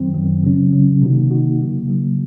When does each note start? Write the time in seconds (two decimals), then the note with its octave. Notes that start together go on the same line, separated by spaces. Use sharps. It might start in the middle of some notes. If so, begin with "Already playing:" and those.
Already playing: F#2 D#3 F#3 C4
0.14 F#2 D#3 F#3 C4
0.43 C#3 F#3 C#4
0.72 C#3 F#3 C#4
1.02 C3 D#3 A#3 D#4 F#4
1.31 C3 D#3 A#3 D#4 F#4
1.60 C#3 F#3 A#3
1.88 C#3 F#3 A#3